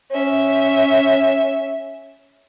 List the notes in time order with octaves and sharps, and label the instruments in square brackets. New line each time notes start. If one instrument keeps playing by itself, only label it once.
[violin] C#4 E5